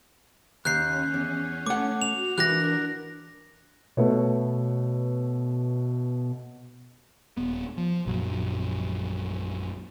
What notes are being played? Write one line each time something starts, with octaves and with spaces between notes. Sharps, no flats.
D#2 C#4 F#6 G6 C7
E2
A3 F#5 D6
F#4 F7
E3 D4 F#4 A#4 F#6 A#6
B2 A3 B3 C#5
D#1 B3
F3
A#1 F#2 A#2 F#3